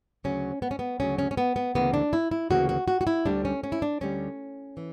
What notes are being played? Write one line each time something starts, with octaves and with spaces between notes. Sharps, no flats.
D2 C#3 F#3 C#4
B3
C#4
B3
D2 C#3 F#3 C#4
C#4
C#4
B3
B3
D2 C#3 E3 A#3 B3
D4
E4
E4
D2 C#3 E3 A#3 F#4
F#4
F#4
F#4
E4
D2 D3 G3 D4
C#4
C#4
E4
D4
D2 D3 G3 C#4
E3